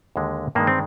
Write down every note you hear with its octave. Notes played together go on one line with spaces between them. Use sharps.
D#2 D3 G#3
G2 D#3 G#3 A#3
C4